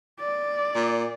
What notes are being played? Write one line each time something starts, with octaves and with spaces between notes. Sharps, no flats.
D5
A#2